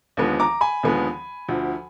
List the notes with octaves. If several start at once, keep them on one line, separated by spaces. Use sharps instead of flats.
D#2 D3 F3 G#3 B3
A#5 D6
G#5 B5
D#2 D3 F3 G#3 B3
D2 D3 F3